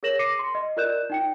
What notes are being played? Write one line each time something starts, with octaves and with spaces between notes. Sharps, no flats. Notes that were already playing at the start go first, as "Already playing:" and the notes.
G#4 A#4 C#5 A#6 E7 F#7
D6 A#6 C7 C#7 D#7
C6
D#5
F4 A#4 D5 F#6 G6 E7
D#4 G5 C#7